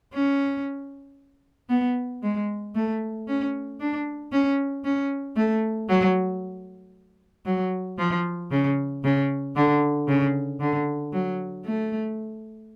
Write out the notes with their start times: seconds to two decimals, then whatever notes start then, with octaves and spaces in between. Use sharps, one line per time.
0.13 C#4
1.69 B3
2.22 G#3
2.75 A3
3.28 C#4
3.80 D4
4.32 C#4
4.84 C#4
5.36 A3
5.89 F#3
7.46 F#3
7.98 F3
8.51 C#3
9.04 C#3
9.56 D3
10.08 C#3
10.60 D3
11.13 F#3
11.65 A3